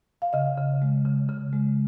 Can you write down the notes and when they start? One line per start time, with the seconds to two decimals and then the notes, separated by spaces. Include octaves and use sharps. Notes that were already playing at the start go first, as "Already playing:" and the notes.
0.22 F5
0.33 C#3 D#5
0.58 C#3
0.82 G#3
1.05 C#3
1.29 C#3
1.53 G#3